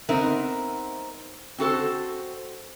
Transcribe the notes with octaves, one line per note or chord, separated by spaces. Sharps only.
B3 C4 D#4 A#4 E5
C4 F#4 A4 C5